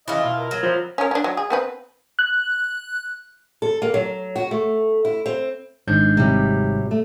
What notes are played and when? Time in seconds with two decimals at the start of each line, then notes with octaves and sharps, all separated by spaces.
0.08 C#3 E3 E4 F4 D#5
0.25 B2 F5
0.39 A#4
0.51 F#3
0.63 F3 C4 E4
0.98 C#4 A#4
1.11 C#4 D4
1.24 F#3
1.37 G#4
1.50 B3 C4 B4
2.19 F#6
3.62 A4
3.82 A#3
3.94 F#3
4.36 F#4
4.51 A3
5.05 E4
5.26 C4
5.87 G#1 G#2 D4 G6
6.17 C3 F#3 G3
6.91 A3